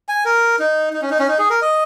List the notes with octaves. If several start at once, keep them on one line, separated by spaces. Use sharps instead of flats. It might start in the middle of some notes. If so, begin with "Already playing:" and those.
G#5
A#4
D#4
D#4
C#4
D#4
C#4
D#4
G#4
A#4
D#5